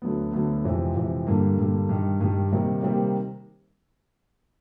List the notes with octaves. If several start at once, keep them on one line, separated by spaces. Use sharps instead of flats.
D2 D3 F#3 B3
D2 D3 F#3 B3
F2 C3 E3 G#3
F2 C3 E3 G#3
G2 D3 G3 A#3
G2 D3 G3 A#3
G2 D#3 G3
G2 D#3 G3
C3 D#3 G3 A#3
C3 D#3 G3 A#3